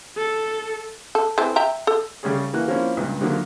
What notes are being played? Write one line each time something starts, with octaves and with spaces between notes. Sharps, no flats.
A4
A4
E3 A3 C4
E5 G5 A#5
A4
C#3 G3 A3 C#4 G#4
E3 A#3 F#4 F#6
F3 A#3 C4 C#4 E4
C#2 G2 A#2
D3 D#3 F3 F#3 A3 A#3